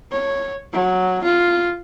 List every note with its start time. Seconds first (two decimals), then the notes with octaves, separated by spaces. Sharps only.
0.12 C#5
0.73 F#3
1.24 F4